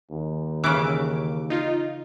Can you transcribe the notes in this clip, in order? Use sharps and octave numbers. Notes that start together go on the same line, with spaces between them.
D#2
C#3 E3 D6 D7
D#4 F4